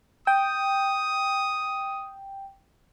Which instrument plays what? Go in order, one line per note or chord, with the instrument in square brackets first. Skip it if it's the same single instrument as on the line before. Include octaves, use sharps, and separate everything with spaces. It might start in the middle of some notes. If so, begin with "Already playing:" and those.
[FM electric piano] G5 [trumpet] D#6